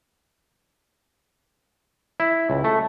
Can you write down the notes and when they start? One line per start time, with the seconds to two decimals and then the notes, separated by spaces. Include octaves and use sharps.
2.20 E4
2.50 C#2
2.64 A3